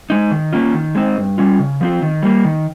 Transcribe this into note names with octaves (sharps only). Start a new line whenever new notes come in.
G#3 D#4
D#3
A#3 C#4 F4
D#3
G#3 C4 D#4
G2
G3 C#4 F4
C#3
F3 C4 F4
D#3
G3 A#3
D#3